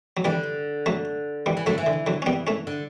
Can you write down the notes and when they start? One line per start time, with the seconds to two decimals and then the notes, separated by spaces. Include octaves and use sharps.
0.17 F#3
0.25 D3 E3 G3
0.86 F#3 A3
1.46 E3 G3
1.57 E3
1.66 D3 F#3 A3
1.78 E3
1.86 D3
2.07 D3 F#3
2.22 C#4
2.26 G3 B3
2.47 A3 C#4
2.67 D3